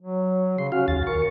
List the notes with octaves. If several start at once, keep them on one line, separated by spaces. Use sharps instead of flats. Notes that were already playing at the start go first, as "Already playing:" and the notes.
F#3
C#3 C6
C#4 F#4 F5
D#2 A6
A#4 C#6